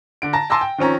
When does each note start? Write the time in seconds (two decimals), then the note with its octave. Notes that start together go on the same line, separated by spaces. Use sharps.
0.22 D3 D7
0.33 A5 A#5 A#6
0.50 G#5 A5 C6 D6 E6 A#6
0.61 G5
0.78 D#3 F3 C4 C#4 A#5